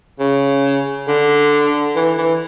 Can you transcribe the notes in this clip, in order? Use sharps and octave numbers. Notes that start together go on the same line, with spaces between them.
C#3
D3
E3
E3